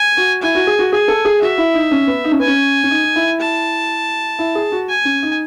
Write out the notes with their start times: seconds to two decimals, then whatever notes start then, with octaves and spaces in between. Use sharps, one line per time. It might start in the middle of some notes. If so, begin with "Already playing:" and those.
Already playing: G#5
0.17 F#4
0.42 E4 G#5
0.55 F#4
0.67 G#4
0.79 F#4
0.92 G#4 G#5
1.08 A4
1.25 G#4
1.42 F#4 E5
1.58 E4
1.74 D#4
1.91 C#4
2.07 B3
2.24 D#4
2.31 C#4
2.39 B3 G#5
2.47 C#4
2.84 C#4
2.91 D#4
3.04 D#4
3.16 E4
3.40 A5
4.39 E4
4.55 G#4
4.72 F#4
4.89 G#5
5.05 C#4
5.23 D#4